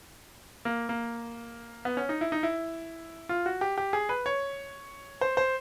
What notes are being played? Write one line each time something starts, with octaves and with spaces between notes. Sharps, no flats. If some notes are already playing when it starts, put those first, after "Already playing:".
A#3
A#3
B3
C#4
D#4
E4
D#4
E4
F4
F#4
G4
G4
G#4
B4
C#5
C5
C5